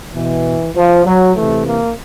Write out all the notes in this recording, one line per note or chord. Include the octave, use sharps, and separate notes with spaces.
B2 E3
F3
F#3
C3 E3 A3
A#3